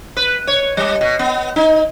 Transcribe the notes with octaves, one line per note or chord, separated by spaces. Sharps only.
B4
C#5
G3
B2
B3
D#4